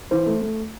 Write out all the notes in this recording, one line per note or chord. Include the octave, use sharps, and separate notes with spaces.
E3 C5
A3
A3